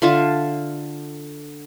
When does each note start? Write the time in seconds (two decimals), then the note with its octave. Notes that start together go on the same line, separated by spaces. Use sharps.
0.02 D3 F4 E5 A5